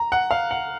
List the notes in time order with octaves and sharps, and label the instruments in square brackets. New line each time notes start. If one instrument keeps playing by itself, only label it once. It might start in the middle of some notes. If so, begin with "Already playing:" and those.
Already playing: [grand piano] A#5
F#5
F5
F#5